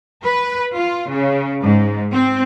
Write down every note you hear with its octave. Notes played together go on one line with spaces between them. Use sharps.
B4
F4
C#3
G#2
C4